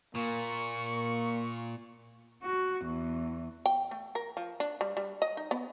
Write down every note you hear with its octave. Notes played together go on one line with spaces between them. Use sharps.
A#2 A#3 C#6
F#4
E2
G5
A3
A#4
F3
D4
G3
G3
D#5
D#4
B3